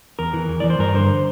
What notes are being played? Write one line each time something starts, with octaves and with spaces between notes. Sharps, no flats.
E2 A#4
E3
E2
E3 D5
C5
G2 A#4
D3 C5